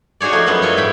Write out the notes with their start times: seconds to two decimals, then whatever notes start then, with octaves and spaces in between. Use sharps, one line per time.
0.21 D#4 F#4 G#4 C#5 D5
0.32 F3 A3 D#4
0.47 F#2 B3 D#4 B4
0.62 E4 F4 C#5 D#5
0.77 G#2 G5 B5